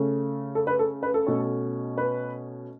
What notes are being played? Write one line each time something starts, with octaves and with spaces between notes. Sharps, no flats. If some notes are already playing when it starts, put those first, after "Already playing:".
Already playing: C#3 A3 C#4
A4
B4
A4
B4
A4
B2 A3 C#4
B4